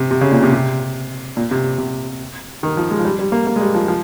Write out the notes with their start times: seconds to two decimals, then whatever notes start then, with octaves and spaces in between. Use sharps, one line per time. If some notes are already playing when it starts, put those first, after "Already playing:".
Already playing: C3
0.11 C3
0.21 C#3
0.32 A#2
0.43 C3
0.53 C3
1.37 A#2
1.51 C3
1.78 C3
2.63 D#3
2.77 F3
2.91 G#3
2.99 F3
3.05 G3
3.19 G3
3.32 A#3
3.47 A#3
3.56 G#3
3.61 G3
3.75 F3
3.88 F3